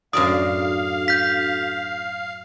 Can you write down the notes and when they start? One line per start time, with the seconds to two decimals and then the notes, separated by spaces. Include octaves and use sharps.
0.13 F#2 A2 D4 F#4 A4 D5 F5 D#6
1.08 G6 B6